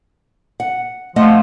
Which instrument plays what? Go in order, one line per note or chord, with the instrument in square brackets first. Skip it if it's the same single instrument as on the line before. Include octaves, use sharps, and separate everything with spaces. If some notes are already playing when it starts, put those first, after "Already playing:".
[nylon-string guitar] F#5
[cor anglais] F3 [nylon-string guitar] A3 D#5 F#5